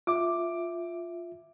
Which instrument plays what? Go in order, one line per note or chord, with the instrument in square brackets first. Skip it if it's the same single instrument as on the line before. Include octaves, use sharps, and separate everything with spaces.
[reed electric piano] F4 E5 [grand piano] D6